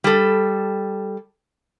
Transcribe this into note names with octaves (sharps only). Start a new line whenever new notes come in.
G3 A4